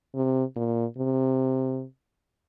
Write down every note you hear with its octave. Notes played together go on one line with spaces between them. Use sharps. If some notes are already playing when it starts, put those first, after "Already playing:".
C3
A#2
C3